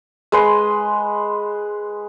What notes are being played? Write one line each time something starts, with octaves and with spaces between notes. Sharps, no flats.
G#3 B4 C6